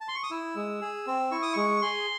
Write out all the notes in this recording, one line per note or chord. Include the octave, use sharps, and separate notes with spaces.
A5
C6
C#6
D#6
E4 E6
G#3
G#4
C4
E4 C#6
D#6
G#3 C#6
G#4 C6